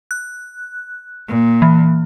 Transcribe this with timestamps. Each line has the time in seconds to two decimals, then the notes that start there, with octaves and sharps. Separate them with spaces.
0.11 F#6
1.28 A#2
1.62 E3